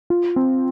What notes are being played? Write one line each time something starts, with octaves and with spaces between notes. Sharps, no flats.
F4
C4